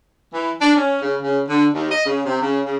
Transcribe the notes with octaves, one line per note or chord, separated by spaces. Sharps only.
E3
D4
C#4
C#3
C#3
D3
D#2
D#5
C#3
C3
C#3
C#3